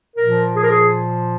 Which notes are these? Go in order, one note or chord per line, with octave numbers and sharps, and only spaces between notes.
A#2 F3 A#4
G#4
A#4
G#4